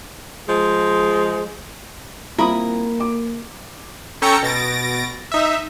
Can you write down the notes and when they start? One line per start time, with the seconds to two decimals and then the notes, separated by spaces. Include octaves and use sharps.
0.48 F3 G#3
2.38 G3 A#3 C4 E4 F4 A#4 B5 D#6
3.00 D6
4.22 C#4 A4 G5 A#5 C#6 C#7
4.43 B2 A6 A#6 D7
5.32 D#4 E5